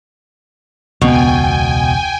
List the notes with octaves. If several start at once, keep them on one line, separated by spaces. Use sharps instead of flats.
E1 C#2 B2 B3 G5 G#5